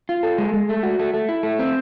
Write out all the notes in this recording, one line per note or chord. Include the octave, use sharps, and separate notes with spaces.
F4
A4
G#3
G#3
A3
F#4
A3
A3
E4
A3
C4